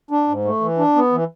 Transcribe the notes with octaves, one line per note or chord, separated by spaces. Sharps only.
D4
G#2
A3
E3
D4
B3
E3